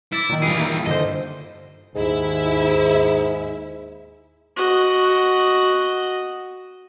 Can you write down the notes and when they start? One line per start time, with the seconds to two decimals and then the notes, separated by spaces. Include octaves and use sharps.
0.13 E4 D6 A6
0.29 A#2 D#3
0.43 G2 E3 F4 G#4
0.57 D#3 A#3 E4
0.87 G2 D3 C5 D#5
1.95 D#2 G#2 E4 E5
4.57 F#4 D#5